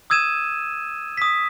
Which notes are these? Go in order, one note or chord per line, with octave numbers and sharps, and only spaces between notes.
D#6 E6 G#6 D#7 E7
D#6 B6